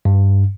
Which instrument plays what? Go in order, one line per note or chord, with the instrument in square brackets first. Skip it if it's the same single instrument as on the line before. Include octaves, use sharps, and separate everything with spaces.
[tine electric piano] G2